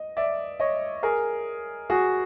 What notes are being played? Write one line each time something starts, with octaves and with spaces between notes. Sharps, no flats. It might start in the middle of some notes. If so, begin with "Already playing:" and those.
Already playing: D#5
D5 E5
C#5 D#5
G#4 A#4
F#4 G#4